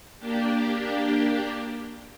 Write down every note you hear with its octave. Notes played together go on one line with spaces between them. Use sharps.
A#3 D4 G4